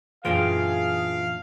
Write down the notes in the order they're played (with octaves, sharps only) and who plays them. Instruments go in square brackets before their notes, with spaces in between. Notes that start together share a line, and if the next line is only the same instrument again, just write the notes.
[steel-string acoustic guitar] F#2 A#2 D4 [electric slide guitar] E3 F4 G5 [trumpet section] G#4 [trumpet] F5